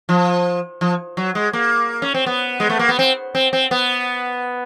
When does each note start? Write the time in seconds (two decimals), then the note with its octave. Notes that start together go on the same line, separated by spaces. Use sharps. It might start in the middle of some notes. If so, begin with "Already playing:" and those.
0.09 F3
0.81 F3
1.17 F#3
1.35 G#3
1.53 A#3
2.02 C#4
2.14 C4
2.26 B3
2.60 G#3
2.70 A3
2.79 A#3
2.89 B3
2.99 C4
3.35 C4
3.53 C4
3.71 B3